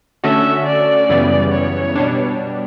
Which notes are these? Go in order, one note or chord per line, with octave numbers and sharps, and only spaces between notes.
D3 A3 C#4 F#4 A4 E5
D5
F#2 C#3 E3 G3 B3
C#5
B2 G3 D4